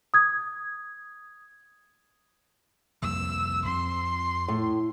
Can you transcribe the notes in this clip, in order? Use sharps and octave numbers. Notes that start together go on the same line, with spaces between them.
D#6 G#6
C2 F2 A#3 E6
F2 C4 C6
A2